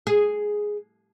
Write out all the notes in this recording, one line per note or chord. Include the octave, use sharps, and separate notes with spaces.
G#4